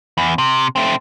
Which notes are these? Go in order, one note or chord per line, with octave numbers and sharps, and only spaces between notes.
E2
C3
A3 C4